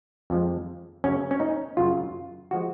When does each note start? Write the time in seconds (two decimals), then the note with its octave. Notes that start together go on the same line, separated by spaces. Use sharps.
0.30 F2 F3 G#3
1.04 F#2 C#3 F#3 C#4
1.31 C#4
1.40 D#4
1.77 F#2 C#3 F#3 F4
2.51 F3 G#3 F#4